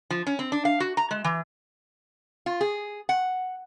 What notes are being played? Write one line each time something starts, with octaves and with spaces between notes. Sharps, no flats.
F3
C#4
C4
D4
F5
F#4
A#5
G#3
E3
F4
G#4
F#5